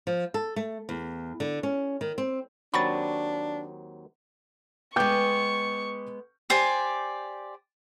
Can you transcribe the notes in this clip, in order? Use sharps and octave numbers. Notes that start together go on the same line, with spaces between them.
F3
A4
A3
E2
D3
C#4
D#3
C4
D#2 F#3 C4 D4 B5 C#6 A6
G#3 B3 G5 C#6 D6 G6
G4 C5 D5 G#5